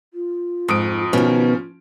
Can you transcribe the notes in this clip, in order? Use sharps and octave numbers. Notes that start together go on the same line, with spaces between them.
F4
F2 G#2 D#6 D7
B2 D#3 F3 C#4